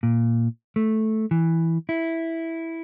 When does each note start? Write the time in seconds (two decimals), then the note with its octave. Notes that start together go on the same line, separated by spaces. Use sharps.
0.03 A#2
0.76 A3
1.31 E3
1.89 E4